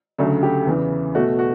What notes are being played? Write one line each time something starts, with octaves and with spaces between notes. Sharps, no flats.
D2 C#3 F#3 A3 A4
G4
E2 C#3 E3
B2 A3 F#4
F#4